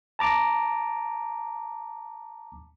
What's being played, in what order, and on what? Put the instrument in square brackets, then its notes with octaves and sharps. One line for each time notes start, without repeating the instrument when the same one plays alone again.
[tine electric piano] A5 A#5 D6